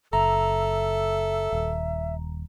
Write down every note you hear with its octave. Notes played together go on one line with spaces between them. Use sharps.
F#1 A4 E5 A#5
D#1